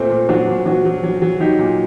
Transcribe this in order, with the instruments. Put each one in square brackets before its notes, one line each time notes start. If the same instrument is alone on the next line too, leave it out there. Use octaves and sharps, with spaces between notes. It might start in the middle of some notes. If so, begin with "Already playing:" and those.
Already playing: [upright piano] A#2 A3 C4
A#2
F#3 D4 F#4
A#2
F#3 D4 F#4
F#3
F#3
F#3
F#3 D#4 G4
A#2